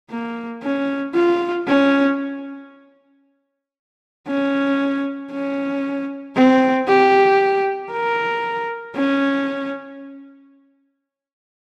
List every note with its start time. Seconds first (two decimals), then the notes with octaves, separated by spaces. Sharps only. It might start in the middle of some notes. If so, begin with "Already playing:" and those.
0.10 A#3
0.63 C#4
1.15 F4
1.67 C#4
4.28 C#4
5.32 C#4
6.36 C4
6.88 G4
7.92 A#4
8.96 C#4